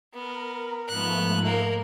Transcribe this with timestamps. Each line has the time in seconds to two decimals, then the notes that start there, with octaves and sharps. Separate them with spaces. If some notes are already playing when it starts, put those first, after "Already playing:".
0.14 B3 A#4
0.88 G#2 F3 A3 B3 F#6
1.44 A#3 A#4